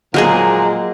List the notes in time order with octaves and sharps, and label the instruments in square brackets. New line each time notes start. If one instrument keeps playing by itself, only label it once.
[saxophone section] A#2 F3 G#3 [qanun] F#3 A#3 G#4